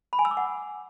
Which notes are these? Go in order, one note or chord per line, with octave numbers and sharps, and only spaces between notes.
B5
G#5
E6
D6
F#5